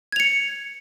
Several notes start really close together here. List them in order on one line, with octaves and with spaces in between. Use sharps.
G#6 F7 C#7